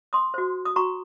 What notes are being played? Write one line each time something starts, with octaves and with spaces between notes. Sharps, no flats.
C6 D#6
F#4 C5
D#6
F#4 A#5 C#6